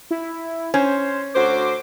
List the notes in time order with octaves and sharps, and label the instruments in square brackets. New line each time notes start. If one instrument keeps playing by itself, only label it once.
[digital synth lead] E4
[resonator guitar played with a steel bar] C#4 [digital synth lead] C5
[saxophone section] D2 F#4 C5 [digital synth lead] D6